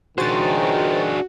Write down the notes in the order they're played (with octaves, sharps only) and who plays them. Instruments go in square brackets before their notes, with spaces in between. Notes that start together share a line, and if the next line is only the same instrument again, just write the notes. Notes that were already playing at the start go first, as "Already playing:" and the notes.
[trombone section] C#2 D#3 [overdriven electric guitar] D4 G#4 [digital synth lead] F#4 [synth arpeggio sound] C5 A6